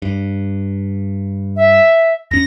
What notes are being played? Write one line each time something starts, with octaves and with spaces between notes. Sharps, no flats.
G2
E5
E2 C#4 A#6